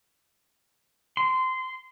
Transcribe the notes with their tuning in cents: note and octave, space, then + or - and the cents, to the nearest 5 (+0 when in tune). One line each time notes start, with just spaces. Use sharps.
C6 -20